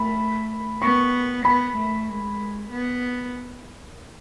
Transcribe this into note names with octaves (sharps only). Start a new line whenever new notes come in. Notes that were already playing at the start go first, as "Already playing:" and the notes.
Already playing: A3 B5
B3 C#6
B3 B5
A3
G#3
B3